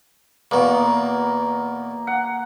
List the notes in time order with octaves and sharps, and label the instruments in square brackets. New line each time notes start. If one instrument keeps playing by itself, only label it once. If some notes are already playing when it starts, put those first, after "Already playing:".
[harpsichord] E2 B2 [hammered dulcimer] A#3
[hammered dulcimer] F#5